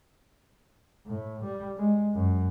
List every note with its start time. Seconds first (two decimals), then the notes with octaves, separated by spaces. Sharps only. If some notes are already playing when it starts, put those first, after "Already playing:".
1.07 A2
1.43 G3
1.78 G#3
2.14 F#2